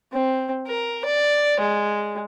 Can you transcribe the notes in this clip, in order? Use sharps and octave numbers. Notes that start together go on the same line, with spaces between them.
C4
A#4
D5
G#3